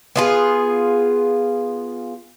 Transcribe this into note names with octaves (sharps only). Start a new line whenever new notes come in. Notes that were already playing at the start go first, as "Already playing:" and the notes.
B3 F4 G#4